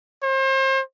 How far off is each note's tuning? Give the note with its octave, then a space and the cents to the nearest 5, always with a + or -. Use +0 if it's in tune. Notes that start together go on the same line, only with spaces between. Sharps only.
C5 +35